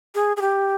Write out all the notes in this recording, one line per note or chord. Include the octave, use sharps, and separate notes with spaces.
G#4
G#4
G4